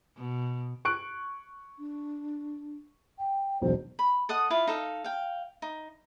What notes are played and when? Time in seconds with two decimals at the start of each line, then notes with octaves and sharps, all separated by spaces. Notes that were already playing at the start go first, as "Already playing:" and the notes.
0.17 B2
0.85 C#6 F#6 D7
1.79 D4
3.19 G5
3.62 E1 B1 C5
3.99 B5
4.29 A4 D#5 F#5 D#6
4.50 E4 F4 F5
4.67 D#4 A4 F5
5.04 F5 G5
5.62 D#4